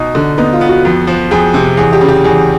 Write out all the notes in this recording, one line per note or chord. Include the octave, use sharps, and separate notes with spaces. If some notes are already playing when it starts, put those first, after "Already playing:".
Already playing: B2 D#4
D3
B3 D#4
F4
B3
F#4
F2
F3
F2 G#4
C3
E2 G#4
G4
C#3
G4
E2 G#4